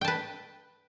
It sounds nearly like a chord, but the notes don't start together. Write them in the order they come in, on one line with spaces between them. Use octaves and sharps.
G5 A5 B4